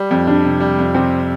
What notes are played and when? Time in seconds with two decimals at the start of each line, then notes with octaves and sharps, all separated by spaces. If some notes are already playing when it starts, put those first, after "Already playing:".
Already playing: G3
0.11 F2
0.27 G3 D4
0.44 C3
0.60 G3
0.78 F2
0.94 C3 C4